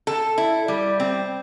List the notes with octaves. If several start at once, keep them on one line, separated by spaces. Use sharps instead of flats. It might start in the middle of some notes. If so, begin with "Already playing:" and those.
A4
E4
G3
C4